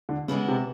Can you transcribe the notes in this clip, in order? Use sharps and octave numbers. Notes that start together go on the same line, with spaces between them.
D3
C#3 E3 G#3 B3 E4
C3